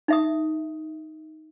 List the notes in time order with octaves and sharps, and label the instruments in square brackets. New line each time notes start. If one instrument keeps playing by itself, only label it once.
[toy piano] D#4 E5 D#6